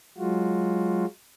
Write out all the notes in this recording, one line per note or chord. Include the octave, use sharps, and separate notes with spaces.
F#3 G#3 F4 F#4